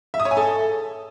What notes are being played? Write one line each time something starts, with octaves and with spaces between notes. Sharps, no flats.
E5
D#6
C#5
G#5
A4